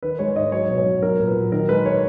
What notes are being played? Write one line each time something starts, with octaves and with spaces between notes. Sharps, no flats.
D#3 B4
G#3 C#5
G#2 D#5
F#3 C#5
B2
C#5
F#3
F#3 A#4
A#2
B4
F#3
D#3 A#4
G#3 B4
C#5